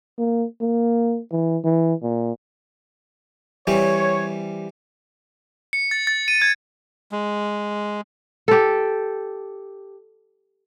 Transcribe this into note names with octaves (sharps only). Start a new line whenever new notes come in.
A#3
A#3
E3
E3
A#2
E3 G3 C4 C#5
C#7
A6
A6
D#7
G#6
G#3
G4 A4